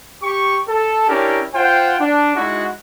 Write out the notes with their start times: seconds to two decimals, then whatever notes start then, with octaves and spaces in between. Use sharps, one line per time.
0.22 G4 C#6
0.68 A4
1.08 C#4 D4 E4 G4 A#4
1.55 F4 C5 F#5 G5
2.00 D4
2.36 G#3 D#4 E4 F#4